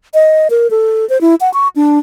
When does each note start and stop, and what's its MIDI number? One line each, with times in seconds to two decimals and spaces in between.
0.14 0.48 75
0.50 0.70 70
0.70 1.08 69
1.09 1.20 72
1.21 1.35 64
1.41 1.52 78
1.54 1.68 85
1.76 1.99 62